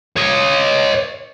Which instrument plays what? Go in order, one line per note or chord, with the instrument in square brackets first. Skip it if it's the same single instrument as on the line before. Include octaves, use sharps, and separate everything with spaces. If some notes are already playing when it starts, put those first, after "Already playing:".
[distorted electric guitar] C#5 D#5